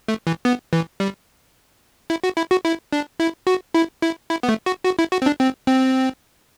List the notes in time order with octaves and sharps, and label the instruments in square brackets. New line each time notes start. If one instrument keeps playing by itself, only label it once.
[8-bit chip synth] A3
E3
B3
E3
G3
E4
F#4
E4
F#4
E4
D4
E4
F#4
E4
E4
E4
B3
A3
F#4
F#4
E4
F#4
C4
D4
C4
C4